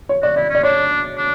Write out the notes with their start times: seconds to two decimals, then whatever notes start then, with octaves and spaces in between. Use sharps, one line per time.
0.09 C#5
0.23 F#4 D5
0.36 E4 D5
0.50 C#4
0.55 D5
0.63 D4 C#5
1.18 D4